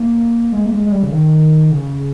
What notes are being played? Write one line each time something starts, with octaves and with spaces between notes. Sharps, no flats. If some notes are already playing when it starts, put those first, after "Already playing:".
Already playing: A#3
G#3
A#3
G#3
G#3
G3
C#3
D#3
C#3